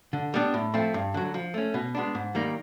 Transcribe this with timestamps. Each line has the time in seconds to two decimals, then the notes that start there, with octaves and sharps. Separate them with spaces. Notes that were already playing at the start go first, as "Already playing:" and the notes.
0.13 D3
0.34 G3 B3 D4
0.54 A2
0.74 F3 A3 C4
0.94 G2
1.14 D3 F#3
1.34 F3
1.54 A3 C#4
1.74 B2
1.95 G#3 B3 D4
2.15 G#2
2.35 D#3 G3 A#3 D#4